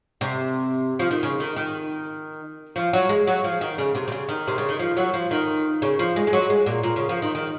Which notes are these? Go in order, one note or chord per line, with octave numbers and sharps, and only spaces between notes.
C3
F3
D#3
C#3
D#3
D#3
F3
F#3
G#3
F#3
F3
D#3
C#3
C3
C3
C#3
D#3
C3
C#3
D#3
F3
F#3
F3
D#3
C#3
F3
G#3
G#3
F#3
G#3
A#2
A#2
C#3
F3
D#3
D#3